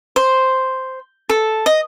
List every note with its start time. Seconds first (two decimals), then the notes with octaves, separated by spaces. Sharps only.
0.16 C5
1.29 A4
1.66 D#5